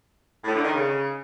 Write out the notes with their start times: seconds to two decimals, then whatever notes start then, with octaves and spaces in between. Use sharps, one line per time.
0.44 A2
0.54 D3
0.64 D#3
0.73 C#3